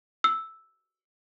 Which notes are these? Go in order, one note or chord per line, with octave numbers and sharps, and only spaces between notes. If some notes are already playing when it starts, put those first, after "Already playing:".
E6